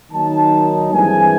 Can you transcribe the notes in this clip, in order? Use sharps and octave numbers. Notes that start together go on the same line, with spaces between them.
D#3 F#3 A#3 D#4 A5
G2 E3 G#3 C4 G#5